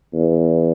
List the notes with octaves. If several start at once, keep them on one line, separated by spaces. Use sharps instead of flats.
E2